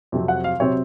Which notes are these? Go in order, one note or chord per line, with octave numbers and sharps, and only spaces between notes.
F2 C3 F#3 C4
F#5
F5
C3 F#3 C4 C#5